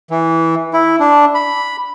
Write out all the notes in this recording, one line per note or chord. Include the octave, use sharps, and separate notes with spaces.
E3
E4
D4
B5